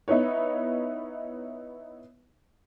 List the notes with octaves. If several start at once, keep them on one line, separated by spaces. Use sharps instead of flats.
B3 D#4 E4 B4 C#5